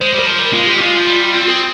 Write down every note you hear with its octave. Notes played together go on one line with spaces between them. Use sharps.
G#3 C5
G3
A#4
F3
G3
G#3 F4
G4
G3
G#3 F4
F3
G3
C4
G#4